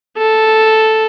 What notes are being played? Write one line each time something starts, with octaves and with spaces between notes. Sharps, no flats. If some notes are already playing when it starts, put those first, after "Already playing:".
A4